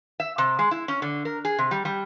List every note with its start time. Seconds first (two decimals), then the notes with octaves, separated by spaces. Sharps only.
0.20 E5
0.38 C3
0.59 G#3
0.71 E4
0.88 C#4
1.02 D3
1.25 A#4
1.45 G#4
1.58 C3
1.71 G3
1.85 G3